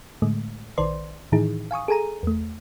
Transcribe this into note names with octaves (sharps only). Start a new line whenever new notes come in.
A2 D3 G#3 A3
A#1 D#3 B4 C5 D5 C6
A2 D#3 E3 D#4 E4 G#4
F5 G#5 C#6 D#6
G#4 A4 G#5 A#5 D#7
E2 A3